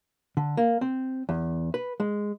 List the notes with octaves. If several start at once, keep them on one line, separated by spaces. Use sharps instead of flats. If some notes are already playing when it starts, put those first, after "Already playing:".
D3
A#3
C4
E2
B4
G#3